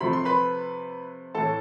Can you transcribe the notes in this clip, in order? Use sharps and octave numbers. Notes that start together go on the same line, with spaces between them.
C3 F3 A3 B5
C6
B4 B5
A2 E3 A3 A4 A5